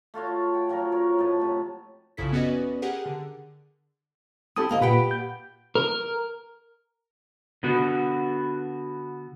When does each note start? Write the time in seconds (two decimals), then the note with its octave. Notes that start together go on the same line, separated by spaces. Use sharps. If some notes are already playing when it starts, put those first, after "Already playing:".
0.14 A3 F4 F#4 C#5
0.54 F#5 G5
0.69 F3 F#3 F#4 A#4
0.92 C#4 A#4 C#5
1.18 A2 B4 D#5 A5
1.40 A2 C3
2.17 A#1 F#2 C#3 E4 A4 B6
2.32 B3 C#4 F#4 B4 D5 D#5
2.82 G4 G#4 A#4 F#5
3.06 D3
4.56 C4 E4 G4 A4 D#6
4.69 D2 A#3 D#5
4.81 A#2 G4 B4 F#5 G5 B5
5.11 G6
5.75 A#4
7.63 D3 B3 F#4